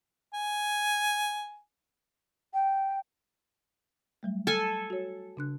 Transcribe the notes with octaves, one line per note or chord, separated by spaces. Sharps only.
G#5
G5
F#3 G3 A3
A4 G#5 A5 F6
F#4 C#5
C#3 D4 F#6